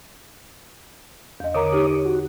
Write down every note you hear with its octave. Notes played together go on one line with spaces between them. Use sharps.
E2 D#5
D3 A#4 C#5 A#5 D6 D#6
D#4 G4
F#4